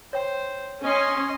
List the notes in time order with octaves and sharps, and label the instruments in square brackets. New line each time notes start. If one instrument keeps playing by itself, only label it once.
[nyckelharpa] C5 [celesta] C#5 G5
[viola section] C#4 [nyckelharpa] D#5 C6